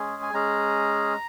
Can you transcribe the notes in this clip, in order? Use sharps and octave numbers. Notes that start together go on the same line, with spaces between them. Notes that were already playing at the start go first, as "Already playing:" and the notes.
Already playing: G#3 C#4 G#4
G#5
G#3 C#4 G#4 A#5